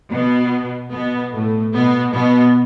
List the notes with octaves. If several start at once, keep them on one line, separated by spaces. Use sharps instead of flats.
B2 B3
B2 B3
A2 A3
B2 B3
B2 B3